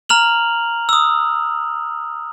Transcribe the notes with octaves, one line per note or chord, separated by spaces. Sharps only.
A#5 F6 F7 F#7
D#6 E6